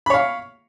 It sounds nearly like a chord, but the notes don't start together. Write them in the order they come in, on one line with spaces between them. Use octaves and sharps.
B5 C#5 F5